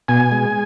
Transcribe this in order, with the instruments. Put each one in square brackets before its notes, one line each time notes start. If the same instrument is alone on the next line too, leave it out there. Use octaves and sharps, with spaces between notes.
[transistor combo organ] B2 G#5
G#3